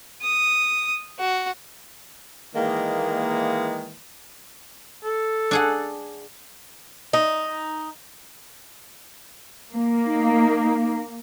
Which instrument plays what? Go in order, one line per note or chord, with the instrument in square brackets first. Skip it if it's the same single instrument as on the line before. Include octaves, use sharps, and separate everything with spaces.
[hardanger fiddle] D#6
F#4
[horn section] D#3 E3 G#3 A#3
[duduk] A4
[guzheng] D4 G#4 F#5
[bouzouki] D#4
[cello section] A#3
[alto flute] D#4